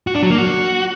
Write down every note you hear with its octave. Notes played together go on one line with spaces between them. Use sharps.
F#4
D4
F#3
A#3
F#4